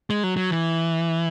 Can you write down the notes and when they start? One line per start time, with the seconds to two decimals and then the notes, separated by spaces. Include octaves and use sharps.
0.10 G#3
0.23 F#3
0.37 F#3
0.51 E3